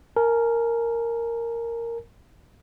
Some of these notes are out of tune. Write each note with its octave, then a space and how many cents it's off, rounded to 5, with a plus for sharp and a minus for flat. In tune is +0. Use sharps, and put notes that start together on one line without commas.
A#4 -5 G#5 +40